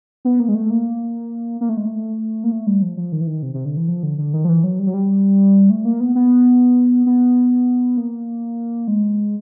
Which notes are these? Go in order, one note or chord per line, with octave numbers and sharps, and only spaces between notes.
B3
A#3
G#3
A3
A#3
A#3
A3
G#3
A3
A#3
A3
G3
F3
F3
D#3
E3
D#3
C3
C3
D3
E3
F3
D3
D3
D#3
F3
E3
F#3
G3
F#3
G3
A3
A#3
B3
B3
B3
A#3
G#3